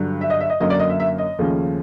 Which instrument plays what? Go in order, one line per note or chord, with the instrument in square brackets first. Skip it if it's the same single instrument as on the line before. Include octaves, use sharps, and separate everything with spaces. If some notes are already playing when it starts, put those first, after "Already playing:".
Already playing: [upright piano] G2 D3 F#3
E5
D#5
E5
D#5
F#2 D3 F#3 A#3 C#4 D#5
D5
D#5
E5
E5
D#5
D#2 C#3 F3 A3 C#4